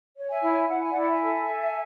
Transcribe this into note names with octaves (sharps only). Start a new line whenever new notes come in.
C#5
E5 G#5
E4
E4 F#5
G#5
E4 D5 F#5
F#5
E5 G#5
A4
A4